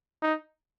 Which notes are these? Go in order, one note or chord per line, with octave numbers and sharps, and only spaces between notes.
D#4